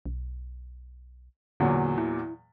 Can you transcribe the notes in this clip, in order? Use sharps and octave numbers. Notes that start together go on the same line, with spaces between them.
B1
E2 A#2 D3 F#3
E4